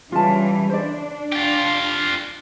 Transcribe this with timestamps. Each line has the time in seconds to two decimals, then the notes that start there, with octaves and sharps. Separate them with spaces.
0.12 C#3 E3 G3 F4 A5
0.70 D4 C5 D5
1.32 F4 G4